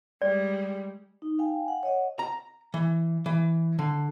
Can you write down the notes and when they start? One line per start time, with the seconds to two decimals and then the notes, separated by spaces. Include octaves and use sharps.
0.22 G3 G#3 D5
1.22 D#4
1.39 F5 G5 G#5
1.68 F#5
1.83 C#5 D#5 F#5
2.19 A#5
2.74 E3
3.26 E3
3.79 D3